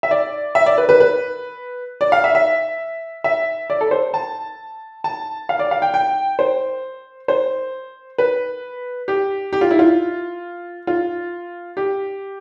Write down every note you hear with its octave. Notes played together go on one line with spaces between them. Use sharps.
E5
D5
E5
D5
B4
B4
B4
D5
F5
E5
E5
E5
D5
A4
C5
A5
A5
F5
D5
F5
G5
G5
C5
C5
B4
G4
G4
F4
E4
F4
F4
G4